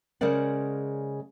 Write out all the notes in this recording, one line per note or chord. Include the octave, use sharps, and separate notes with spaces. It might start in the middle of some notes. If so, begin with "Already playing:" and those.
C#3 G#3 A#4 C5 D5 F#5